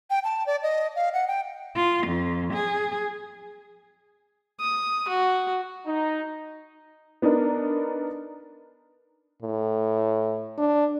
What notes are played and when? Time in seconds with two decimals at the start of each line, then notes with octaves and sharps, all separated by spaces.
0.10 G5
0.24 A5
0.47 D5
0.63 D#5
0.96 F5
1.14 F#5
1.28 G5
1.76 F4
2.06 F2
2.54 G#4
4.60 D#6
5.08 F#4
5.87 D#4
7.22 B3 D4 D#4 A#4
9.42 A2
10.58 D4